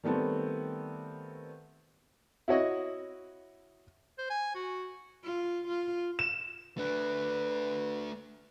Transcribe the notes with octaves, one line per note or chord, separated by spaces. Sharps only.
D#3 G3 A3 B3 C4 A4
E4 F#4 C#5 D#5
C5
G#5
F#4
F4
F4
E7
A3 D4 B4